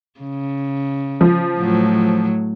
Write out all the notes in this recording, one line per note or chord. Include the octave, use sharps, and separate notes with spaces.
C#3
F3
A2 F#3